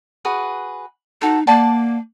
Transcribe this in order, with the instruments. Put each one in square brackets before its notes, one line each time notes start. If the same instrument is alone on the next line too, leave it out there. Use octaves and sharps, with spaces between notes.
[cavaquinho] F#4 G#4 B4
[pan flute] D#4 [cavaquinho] F#4 A4
[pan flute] A#3 [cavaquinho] D5 F#5 A5